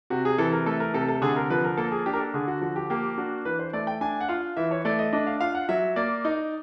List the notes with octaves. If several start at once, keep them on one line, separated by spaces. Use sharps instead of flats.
C3 F#4
G#4
E3 A4
A#4
A3 A4
A#4
C3 A4
A4
D3 G#4
A#4
F3 B4
A#4
A#3 A4
G#4
D4 G4
A#4
A4
D3 G#4
F#4
F3 F#4
G4
A#3 G4
D4 F#4
E3 B4
C5
A3 D5
G5
D4 G#5
F#5
F4 F5
E3 E5
C#5
A3 D5
D#5
D4 D#5
F5
F4 F5
F#5
F#3 E5
A#3 D5
D#4